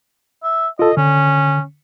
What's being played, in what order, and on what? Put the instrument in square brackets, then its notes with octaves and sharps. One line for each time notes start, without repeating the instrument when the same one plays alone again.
[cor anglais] E5
[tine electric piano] F4 A4 [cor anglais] D#5
[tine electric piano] D3 [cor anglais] C#4